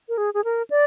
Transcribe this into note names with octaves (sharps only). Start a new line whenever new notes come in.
A#4
G#4
G#4
A#4
D5